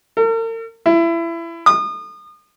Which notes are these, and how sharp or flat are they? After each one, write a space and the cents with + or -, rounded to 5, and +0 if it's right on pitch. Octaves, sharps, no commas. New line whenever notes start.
A#4 -45
E4 +25
D#6 -35